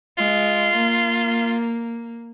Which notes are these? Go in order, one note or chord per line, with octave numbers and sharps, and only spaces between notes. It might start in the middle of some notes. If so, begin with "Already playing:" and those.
G#3 F4
A#3